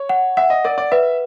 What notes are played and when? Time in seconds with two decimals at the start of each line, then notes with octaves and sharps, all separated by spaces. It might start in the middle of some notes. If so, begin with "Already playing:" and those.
Already playing: C#5
0.09 F#5
0.37 E5 F#5
0.50 D#5
0.65 A#4 D5
0.78 D5
0.92 B4 E5